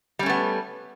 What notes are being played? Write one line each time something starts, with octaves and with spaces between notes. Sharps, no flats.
G3 A3 B3 C#4